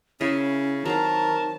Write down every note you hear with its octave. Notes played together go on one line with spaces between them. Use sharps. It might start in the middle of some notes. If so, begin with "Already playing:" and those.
C#3 C#4 E4 A#4 E5
D#3 F#3 C4 A#4 F5 A5